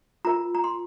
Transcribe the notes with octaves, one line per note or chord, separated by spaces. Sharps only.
F4 A#4 A#5
A#5
C6